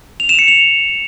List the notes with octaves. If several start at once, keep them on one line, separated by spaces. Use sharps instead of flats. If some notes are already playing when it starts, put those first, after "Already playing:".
F7
E7
C#7
F7